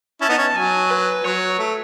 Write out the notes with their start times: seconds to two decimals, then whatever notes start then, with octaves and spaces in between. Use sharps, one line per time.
0.21 C#4 E4 A5
0.29 B3 D#4
0.38 C#4
0.55 F#3 G#5
0.90 B4
1.25 F#3 C#5
1.59 A3